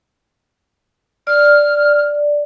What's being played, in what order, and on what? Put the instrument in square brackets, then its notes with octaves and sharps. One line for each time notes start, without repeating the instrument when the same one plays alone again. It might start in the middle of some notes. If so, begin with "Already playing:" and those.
[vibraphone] D5 [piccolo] F6